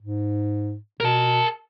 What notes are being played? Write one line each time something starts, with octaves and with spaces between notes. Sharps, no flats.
G#2
B2 A#4 A5